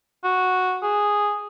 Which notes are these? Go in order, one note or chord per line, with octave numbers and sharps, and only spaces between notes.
F#4
G#4